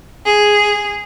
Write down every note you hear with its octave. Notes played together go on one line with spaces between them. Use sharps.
G#4